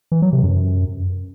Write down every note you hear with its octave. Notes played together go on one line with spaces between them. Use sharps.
E3
F#3
C3
F#2